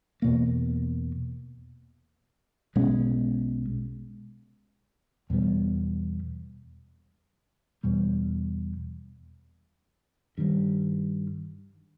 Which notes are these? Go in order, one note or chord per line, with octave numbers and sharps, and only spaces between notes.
E2 B2 A#3
B1 B2 G#3 C#4
E2 B2 G3 B3
E2 B2 G3
G2 D#3 G3